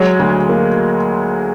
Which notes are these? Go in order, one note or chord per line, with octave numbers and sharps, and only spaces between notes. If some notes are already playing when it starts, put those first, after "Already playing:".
Already playing: F#3 G#3
D2
A#3